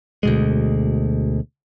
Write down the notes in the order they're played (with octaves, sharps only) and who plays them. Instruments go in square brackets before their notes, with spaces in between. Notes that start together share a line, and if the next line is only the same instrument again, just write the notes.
[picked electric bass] D2 B2 G#3